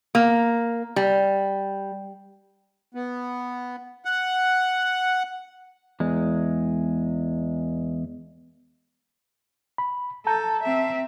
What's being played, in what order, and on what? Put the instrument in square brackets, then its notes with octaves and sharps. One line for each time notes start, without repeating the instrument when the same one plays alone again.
[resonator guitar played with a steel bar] A#3
G3
[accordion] B3
F#5
[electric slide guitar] E2 G#3
[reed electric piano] B5
[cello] A4 [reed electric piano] A5 A#5 G6
[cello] C4 E5